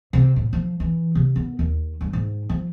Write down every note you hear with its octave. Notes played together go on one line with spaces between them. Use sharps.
C3
A2
F3
E3
C3
B3
D#2
G2
G#2
F3